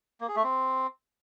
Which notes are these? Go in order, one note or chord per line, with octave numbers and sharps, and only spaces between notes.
A#3
G#4
A3
C4